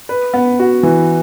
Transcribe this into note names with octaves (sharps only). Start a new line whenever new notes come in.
B4
B3
F#4
E3